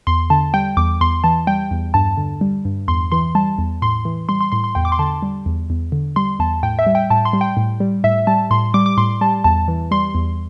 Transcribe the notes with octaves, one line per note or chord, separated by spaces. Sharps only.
E2 C6
D3 A5
G3 G5
E2 D6
E2 C6
E3 A5
G3 G5
E2
G2 A5
D3
G3
G2
E2 C6
E3 C6
G3 A5
E2
A2 C6
E3
G3 C6
C6
A2 C6
C6
E2 G5
D6
C6
D3 A5
G3
E2
E2
D3
G3 C6
E2 A5
A2 G5
E5
G3
G5
A2 A5
C6
G3
G5
A2
G3
A2 E5
G3 A5
A2 C6
G3 D6
D6
A2 C6
G3 A5
E2 A5
E3
G3 C6
E2